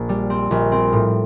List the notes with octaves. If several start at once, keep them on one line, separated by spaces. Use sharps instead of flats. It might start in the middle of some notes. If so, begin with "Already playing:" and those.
Already playing: A#1
G3
C4
A#1
C4
A2